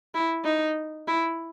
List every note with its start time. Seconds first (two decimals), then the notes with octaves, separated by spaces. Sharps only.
0.14 E4
0.44 D#4
1.07 E4